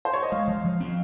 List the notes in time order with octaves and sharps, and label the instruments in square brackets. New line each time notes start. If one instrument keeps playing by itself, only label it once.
[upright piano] C5
C#5
D#5
[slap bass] G#3 [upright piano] F5
[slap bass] F3
F3
C4